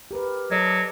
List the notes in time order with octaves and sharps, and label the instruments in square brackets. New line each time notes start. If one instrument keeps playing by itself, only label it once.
[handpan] G4 A#4 B4
[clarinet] F#3 [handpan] A4 D5 D#5